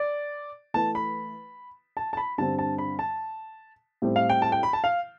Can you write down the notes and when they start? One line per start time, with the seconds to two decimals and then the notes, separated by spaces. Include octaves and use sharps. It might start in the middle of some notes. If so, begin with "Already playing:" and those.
Already playing: D5
0.74 E3 A3 E4 B4 A5
0.95 B5
1.97 A5
2.13 A5
2.17 B5
2.38 G2 D3 G3 C4 A5
2.59 A5
2.78 B5
2.99 A5
4.02 A2 G3 C4 G4
4.16 F5
4.29 G5
4.42 A5
4.52 G5
4.63 B5
4.73 A5
4.84 F5